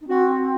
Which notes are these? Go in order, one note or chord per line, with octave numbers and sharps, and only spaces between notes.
D#4
C4 F#4